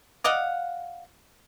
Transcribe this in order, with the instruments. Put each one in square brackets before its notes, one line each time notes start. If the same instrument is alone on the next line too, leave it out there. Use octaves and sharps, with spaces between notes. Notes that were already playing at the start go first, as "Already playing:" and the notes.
[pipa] D5 D#5 F5 F#5